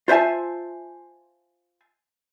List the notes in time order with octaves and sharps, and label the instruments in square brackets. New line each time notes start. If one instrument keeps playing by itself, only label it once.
[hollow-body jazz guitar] F4 C5 E5 G#5 A5